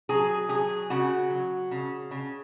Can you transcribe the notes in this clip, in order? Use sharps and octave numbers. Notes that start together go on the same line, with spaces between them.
F#3 G#4
F#3 G#4
C#3 F#4
F#3
C#3
C#3